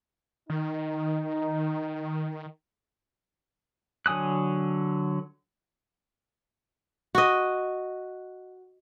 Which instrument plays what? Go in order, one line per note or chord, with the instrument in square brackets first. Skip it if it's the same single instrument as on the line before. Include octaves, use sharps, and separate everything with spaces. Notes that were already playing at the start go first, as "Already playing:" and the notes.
[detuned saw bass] D#3 [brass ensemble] D#4
[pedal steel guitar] D3 F#3 G#5 D#6 F#6
[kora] F#4 D#5